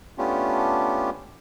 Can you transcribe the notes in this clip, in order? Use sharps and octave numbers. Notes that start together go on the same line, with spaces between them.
A3 B3 C#4 D4 F4 G4